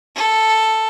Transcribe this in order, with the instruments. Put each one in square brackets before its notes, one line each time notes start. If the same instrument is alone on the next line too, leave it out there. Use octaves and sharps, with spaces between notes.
[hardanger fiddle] A4